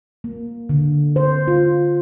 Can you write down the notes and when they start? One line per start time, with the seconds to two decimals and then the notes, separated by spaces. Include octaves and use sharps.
0.24 A#3
0.69 D3
1.16 C5
1.48 F4